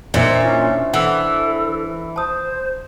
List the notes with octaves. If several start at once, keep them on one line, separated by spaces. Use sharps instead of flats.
A#2 D4 C5 D#5 E5
C#4 E4 D#5
E3 A4 F#5 E6
C5 A5 D#6